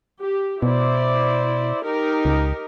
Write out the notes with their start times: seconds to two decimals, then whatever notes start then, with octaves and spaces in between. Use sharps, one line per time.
0.20 G4
0.63 B2 E4 C5 D5
1.84 D#4 G4 A#4
2.25 C#2